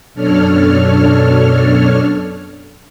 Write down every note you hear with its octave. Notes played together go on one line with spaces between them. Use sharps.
F#2 B2 D4 A4 C#5 F6